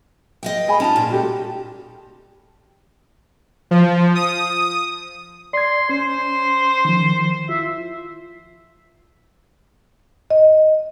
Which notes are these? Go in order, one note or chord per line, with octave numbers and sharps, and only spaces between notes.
D#5 F5 G5
G#4 G#5 B5
C#4 D#4 F4 A5
A#2
F#4 G4 A4
F3
D#6
D5 C6 G#6
C#4 C5
D#3 F3
E4 F4 E5
D#5